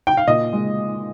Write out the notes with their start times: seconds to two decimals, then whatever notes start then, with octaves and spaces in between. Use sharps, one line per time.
0.07 G5
0.17 F5
0.27 A#2 D#5
0.53 G#3